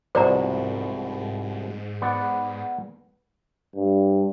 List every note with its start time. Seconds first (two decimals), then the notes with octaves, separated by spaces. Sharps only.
0.15 C2 G#2 B2 F3 C5 D5 A#5
2.02 B3 D5 F#5
3.76 G2